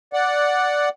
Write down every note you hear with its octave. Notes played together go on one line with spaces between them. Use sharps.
D5 F#5